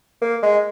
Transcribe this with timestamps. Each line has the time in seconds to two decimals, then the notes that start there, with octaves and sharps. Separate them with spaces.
0.21 A#3
0.42 G#3